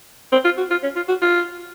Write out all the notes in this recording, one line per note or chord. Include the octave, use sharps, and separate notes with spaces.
C4
F4
F#4
F4
C#4
F4
F#4
F4